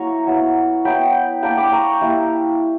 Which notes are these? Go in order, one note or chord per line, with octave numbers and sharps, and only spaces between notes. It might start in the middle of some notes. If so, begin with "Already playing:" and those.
Already playing: F#3 A#3 E4 A#5 C#6
F#3 B3 E4
F#3 B3 E4 G5 B5
A#3 D4 G5 B5
B5 D6
A#5 C#6
G3 A#3 E4